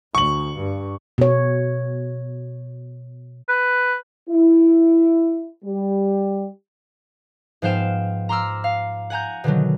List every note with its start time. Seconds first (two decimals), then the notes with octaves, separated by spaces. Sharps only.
0.15 D2 C#6 F#7
0.56 G2
1.18 B2 C#5
3.49 B4
4.29 E4
5.65 G3
7.62 G#2 F3 B3 F5 G5 E7
8.29 A#5 C6 D6 E6 F6
8.64 F5
9.10 F#5 G#5 A#5 G6
9.44 B2 D3 D#3 F#3